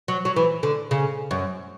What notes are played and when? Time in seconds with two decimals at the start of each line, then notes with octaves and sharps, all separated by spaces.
0.08 F#3
0.25 F#3
0.36 E3
0.63 D3
0.91 C#3
1.31 F#2